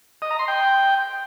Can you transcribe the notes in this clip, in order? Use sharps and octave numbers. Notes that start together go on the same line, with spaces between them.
D#5
A#5
C6
G5